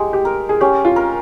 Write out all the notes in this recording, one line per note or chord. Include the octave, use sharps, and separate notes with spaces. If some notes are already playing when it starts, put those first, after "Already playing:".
Already playing: G#3 G4
G4
A#4
G#4
C#4 G4
F4
A#4